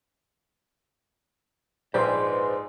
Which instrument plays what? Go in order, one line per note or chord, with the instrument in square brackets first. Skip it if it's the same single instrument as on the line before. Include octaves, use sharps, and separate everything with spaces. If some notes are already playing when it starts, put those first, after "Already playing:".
[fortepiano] A#1 G4 G#4 [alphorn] G#2 [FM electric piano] B4 C6 [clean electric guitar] C5 D5